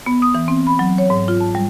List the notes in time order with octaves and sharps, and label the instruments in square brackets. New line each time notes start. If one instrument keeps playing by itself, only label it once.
[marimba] B3
D#6
E3
C4
B5
F#3
C#5
G#2
F4
A5
G3